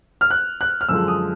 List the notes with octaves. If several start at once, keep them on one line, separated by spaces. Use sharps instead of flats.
F6
F#6
F#6
F6
F#2 D3 F3 G#3 E6
D#6